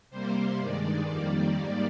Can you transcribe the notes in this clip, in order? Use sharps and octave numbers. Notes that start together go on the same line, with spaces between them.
C3 G3 A#3 C5
G2 D#3 G#3 D5
F2 D#3 G3 A#3
G#2 D#3 G3 A#3 D5